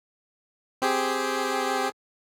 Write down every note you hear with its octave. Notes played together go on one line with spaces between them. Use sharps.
C4 G4 G#4